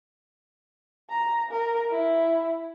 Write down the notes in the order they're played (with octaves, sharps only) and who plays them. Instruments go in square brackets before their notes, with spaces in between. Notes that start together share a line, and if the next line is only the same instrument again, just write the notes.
[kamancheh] A#5
A#4
E4